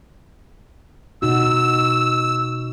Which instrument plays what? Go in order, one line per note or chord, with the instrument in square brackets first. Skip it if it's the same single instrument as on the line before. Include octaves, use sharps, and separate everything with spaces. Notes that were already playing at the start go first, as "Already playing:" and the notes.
[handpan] B2 D#4 F#4 [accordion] E6